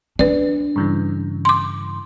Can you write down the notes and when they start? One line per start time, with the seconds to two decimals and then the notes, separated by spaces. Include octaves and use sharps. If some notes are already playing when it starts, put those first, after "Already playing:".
0.19 D4 B4 D5
0.76 G2 C#3 E3
1.45 C6 D6